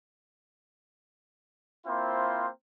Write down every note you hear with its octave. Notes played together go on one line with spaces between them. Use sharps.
A#3 C4 E4 F4 C5